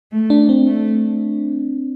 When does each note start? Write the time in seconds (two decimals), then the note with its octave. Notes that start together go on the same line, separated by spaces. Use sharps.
0.12 A3
0.30 D4
0.49 C4
0.67 A3